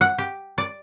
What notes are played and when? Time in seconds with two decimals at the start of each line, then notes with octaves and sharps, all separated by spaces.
0.01 F#5
0.18 G4
0.58 D5